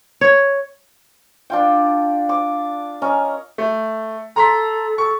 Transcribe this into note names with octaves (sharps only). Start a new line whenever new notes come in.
C#5
D4 F4 G5
D6
C#4 A#4 D#5
A3
A4 A#5 C6 B6
A4 C#6